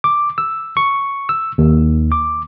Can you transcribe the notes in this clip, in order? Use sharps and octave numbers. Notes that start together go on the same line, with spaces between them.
D6
E6
C#6
E6
D#2
D6